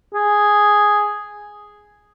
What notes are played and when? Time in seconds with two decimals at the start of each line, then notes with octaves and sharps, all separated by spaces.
0.15 G#4